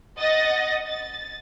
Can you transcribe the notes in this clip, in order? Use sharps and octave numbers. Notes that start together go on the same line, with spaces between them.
D#5 F#5 D#6 A6 A#6
A6